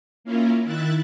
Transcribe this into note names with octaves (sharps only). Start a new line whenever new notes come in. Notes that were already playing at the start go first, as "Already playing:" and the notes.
A#3 C#4 E4 F4 A#4
D#3 E4 E5 F#6 A6